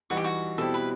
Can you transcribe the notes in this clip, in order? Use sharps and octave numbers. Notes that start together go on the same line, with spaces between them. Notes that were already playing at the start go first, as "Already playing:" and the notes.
E3 G3 D#4 F#4
G4
F#4
B2 G3 C4 E4 G4 A4
B4